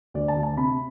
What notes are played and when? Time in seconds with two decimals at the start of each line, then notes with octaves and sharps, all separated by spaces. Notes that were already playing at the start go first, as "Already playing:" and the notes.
0.14 D2 D5
0.28 A5
0.36 D2
0.43 A5
0.57 C3 B5